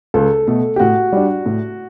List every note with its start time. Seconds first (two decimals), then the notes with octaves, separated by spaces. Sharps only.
0.14 C#2 A4
0.47 B2 A3
0.76 G4
0.79 A2 F#4
1.13 G3 D4
1.46 A2